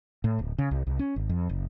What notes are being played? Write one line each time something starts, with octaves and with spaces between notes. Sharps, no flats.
A2
D1
C#3
C2
C2
C#4
G#1
F2
F#1